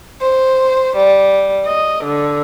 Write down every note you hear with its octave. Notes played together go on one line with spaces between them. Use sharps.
C5
G3
D#5
D3